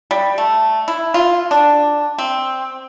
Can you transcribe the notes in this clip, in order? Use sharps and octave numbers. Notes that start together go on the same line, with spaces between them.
G3
A3
E4
F4
D4
C4